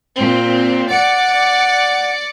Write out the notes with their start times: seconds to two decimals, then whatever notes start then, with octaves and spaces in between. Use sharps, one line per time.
0.17 A#2 C4
0.90 D5 F#5 C#7